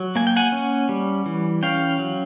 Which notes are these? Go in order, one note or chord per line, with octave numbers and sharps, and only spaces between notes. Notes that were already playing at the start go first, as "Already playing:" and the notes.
Already playing: F#3
A#3 G#5
G5
F#5 G#5
C#4
G3
E3
C#4 F5 G5
F#3